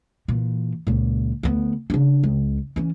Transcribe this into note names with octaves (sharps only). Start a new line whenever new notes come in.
A#2 E3
C#2 A#2
D2 B3
C#3 D4
C#2
E3 C#4